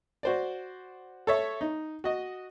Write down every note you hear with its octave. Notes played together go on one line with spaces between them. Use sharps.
F#4 C5 D5
A4 C#5 E5
D#4
F#4 D#5